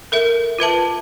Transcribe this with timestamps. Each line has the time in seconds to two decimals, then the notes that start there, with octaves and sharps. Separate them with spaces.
0.12 A4 A#4 E5
0.59 F4 B4 E5 A5